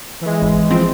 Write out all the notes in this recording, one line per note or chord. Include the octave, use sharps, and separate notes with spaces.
E3 G#3
G#1
F3 C4